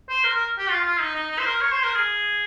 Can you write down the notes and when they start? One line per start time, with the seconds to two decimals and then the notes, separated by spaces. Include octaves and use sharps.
0.09 C5
0.24 A#4
0.36 A#4
0.58 G4
0.70 F4
0.85 F4
1.00 D#4
1.15 D#4
1.31 D#4
1.39 C5
1.46 A#4
1.61 C#5
1.72 C5
1.83 A#4
1.95 G#4